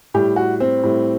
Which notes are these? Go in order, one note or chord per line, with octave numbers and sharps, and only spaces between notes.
A2 G3 G4
F#4
C4
A2 G3